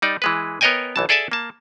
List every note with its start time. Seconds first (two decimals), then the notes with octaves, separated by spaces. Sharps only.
0.02 G3 D#4 D5
0.22 E3 G#3 B4
0.61 B3 A#4 C#5 D#5 G5 G#5
0.96 B1 E3 A5
1.09 G#4 A4 D5 E5 G#5 A5
1.32 A#3 A5